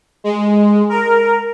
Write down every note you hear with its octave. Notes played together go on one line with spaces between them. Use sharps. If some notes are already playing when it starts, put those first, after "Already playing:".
G#3
A#4